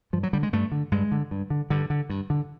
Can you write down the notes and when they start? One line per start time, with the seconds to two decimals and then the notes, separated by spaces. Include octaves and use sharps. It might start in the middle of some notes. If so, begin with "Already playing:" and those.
0.13 G2 F3
0.23 F#3
0.33 D3 G3
0.43 G#3
0.53 G2 A3
0.72 D3
0.92 G2 G#3
1.12 D3
1.31 G2
1.50 D3
1.70 G2 D3
1.90 D3
2.10 G2
2.30 D3